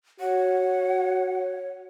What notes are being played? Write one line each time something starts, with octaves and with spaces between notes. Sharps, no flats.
F#4 C#5 F#5